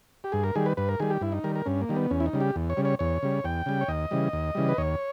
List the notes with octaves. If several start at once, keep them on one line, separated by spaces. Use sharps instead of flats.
G4
G2 G#4
A#4
D#3 G3 G#4
B4
G2 B4
A#4
D#3 G3 G#4
G4
G2 E4
D#4
D#3 G3 A#4
A#4
G2 C#4
A#3
D#3 G3
B3
E2 C#4
E4
D#4
C#3 G3
G4
E2
C#5
C#3 G3
C#5
E2 C#5
C#3 G3
E2 G5
C#3 G3
C#5
D#2 D#5
C#3 E3 G3
D#2
C#3 E3 G3
B4
D#2 C#5